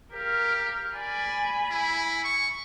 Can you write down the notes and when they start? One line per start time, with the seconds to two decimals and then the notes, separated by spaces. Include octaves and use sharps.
0.13 G4 A#4 F5
0.96 D5 G#5 B5
1.72 E4
2.24 C#6